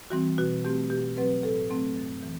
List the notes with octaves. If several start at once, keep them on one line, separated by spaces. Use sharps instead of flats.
E3 G3 C4 F#4
B2 F#4
A3 C4 G4
B2 G4
F#3 C4 B4
A2 A4
F#3 A3 C4
F#2
E3